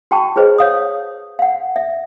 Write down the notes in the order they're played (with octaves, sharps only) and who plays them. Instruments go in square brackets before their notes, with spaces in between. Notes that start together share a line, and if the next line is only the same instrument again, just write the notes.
[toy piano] F#4 G5 A5 C#6
F4 G#4 B4 C5 D#5
C#5 F5 D#6
F5 F#5
E5